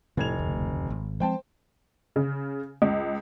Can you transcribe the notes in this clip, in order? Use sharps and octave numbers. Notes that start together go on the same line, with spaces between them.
F1 A2 G#6 F7
F#1 D2
G#1
F3 G#3 C4 C5 G5 A5
C#3
C#2